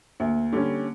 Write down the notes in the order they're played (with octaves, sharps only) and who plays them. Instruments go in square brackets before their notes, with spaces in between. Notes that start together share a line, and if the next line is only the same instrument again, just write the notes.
[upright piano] D2 [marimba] A#3
[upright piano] D3 G3 C#4